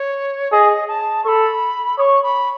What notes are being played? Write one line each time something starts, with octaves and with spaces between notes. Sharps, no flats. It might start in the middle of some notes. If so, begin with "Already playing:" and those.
Already playing: C#5
G#4 D#5
A5
A4 B5 C#6
C#5 C#6 D#6
B5